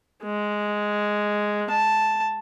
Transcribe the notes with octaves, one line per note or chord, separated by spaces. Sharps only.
G#3
A5